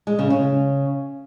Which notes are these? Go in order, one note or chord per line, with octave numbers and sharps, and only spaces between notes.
G#3
C#3
C#3